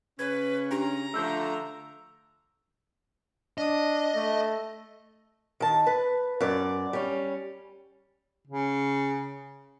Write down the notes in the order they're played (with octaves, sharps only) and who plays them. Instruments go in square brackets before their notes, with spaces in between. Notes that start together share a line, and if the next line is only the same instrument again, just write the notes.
[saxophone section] C#3 C#4 [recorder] B4 [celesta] G#6
[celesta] D4 G4 [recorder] A#5
[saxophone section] D3 F3 A3 [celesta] E6 G6
[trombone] D4 [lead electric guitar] D#5
[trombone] A3
[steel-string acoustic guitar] D#3 A5
B4
F#2 D5
G3 C#4
[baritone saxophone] C#3